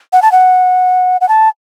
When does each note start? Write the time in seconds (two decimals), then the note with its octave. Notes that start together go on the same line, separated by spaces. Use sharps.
0.13 F#5
0.22 A5
0.32 F#5
1.21 F#5
1.29 A5